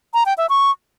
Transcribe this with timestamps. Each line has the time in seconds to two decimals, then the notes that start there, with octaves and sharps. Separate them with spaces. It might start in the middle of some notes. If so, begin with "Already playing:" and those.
0.14 A#5
0.26 G5
0.38 E5
0.49 C#6